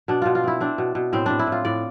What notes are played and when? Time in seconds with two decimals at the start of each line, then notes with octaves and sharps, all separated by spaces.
0.08 B2 D4
0.22 B2 F4
0.35 F4
0.44 C4 E4
0.60 C4 D4
0.78 B2
0.95 B2
1.13 A2 C4
1.26 A2 D4
1.39 E4
1.47 A2
1.52 F4
1.65 A2 D5